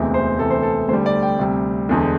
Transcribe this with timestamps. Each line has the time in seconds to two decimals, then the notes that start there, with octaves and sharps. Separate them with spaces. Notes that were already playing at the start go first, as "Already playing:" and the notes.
Already playing: E1 D2 C3 E3
0.14 C5
0.39 D2 C3 E3 A4
0.51 C5
0.63 A4
0.88 D2 D3 G3 C5
1.06 D5
1.23 G5
1.39 D2 C3 G3
1.89 E1 E2 D3